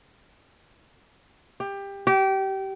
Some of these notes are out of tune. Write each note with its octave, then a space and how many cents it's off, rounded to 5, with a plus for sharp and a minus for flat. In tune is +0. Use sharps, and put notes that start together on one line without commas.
G4 +20
G4 -25